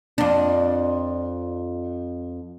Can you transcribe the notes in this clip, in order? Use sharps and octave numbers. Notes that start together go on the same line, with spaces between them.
F2 D4